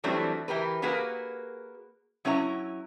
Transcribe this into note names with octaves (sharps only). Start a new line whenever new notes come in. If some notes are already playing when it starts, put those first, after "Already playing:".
E3 F#3 G3 A3 C4 D4
E3 G4 A#4 B4
A#3 F#4 G#4 A#4 B4
F#3 C#4 E4 C5 A#5